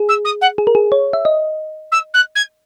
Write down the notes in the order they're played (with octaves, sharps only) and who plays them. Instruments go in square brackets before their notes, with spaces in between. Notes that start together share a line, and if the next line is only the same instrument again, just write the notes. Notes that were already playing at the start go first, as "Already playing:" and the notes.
Already playing: [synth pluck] G#4
[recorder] E6
D#6
F#5
[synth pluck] G#4
A#4
G#4
C#5
E5
D#5
[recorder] E6
F#6
G#6